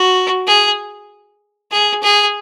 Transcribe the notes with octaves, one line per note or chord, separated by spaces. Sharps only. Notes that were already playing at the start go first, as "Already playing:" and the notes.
Already playing: F#4
G#4
G#4
G#4